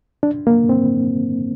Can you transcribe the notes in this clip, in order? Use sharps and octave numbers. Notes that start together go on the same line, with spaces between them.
D4
A#3
C4